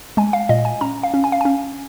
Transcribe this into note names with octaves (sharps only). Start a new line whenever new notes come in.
G#3 G#5
F5
A#2 D#5
G#5
C#4 A#5
F5
C#4
G#5
F5
C#4 G#5